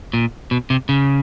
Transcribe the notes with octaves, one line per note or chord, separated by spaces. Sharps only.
A#2
B2
C3
C#3